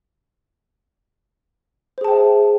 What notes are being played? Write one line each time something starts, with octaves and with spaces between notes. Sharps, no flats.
G#4 C5 E5 G5 A5